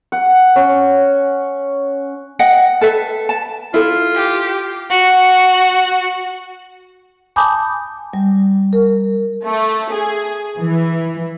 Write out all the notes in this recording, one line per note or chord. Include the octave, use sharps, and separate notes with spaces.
F#5
C#4
D#5 F#5 G5
A4 B4 E5
A5
E4 F4 A4
G4
F#4
G#5 A5 B5 D6 D#6 G6
G3
A#4
A3
G#4
E3